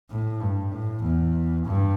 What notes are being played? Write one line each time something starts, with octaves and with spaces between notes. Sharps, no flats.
A2
G2
A2
E2
G2